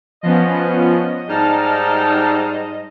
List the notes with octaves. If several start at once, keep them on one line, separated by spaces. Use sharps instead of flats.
F3 B3 C#4 D#5
G#2 G3 D#4 A5 F6